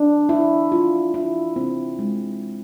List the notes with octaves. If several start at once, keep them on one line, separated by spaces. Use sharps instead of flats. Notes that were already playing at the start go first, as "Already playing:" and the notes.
Already playing: D4
E4
F4
E4
C4
G#3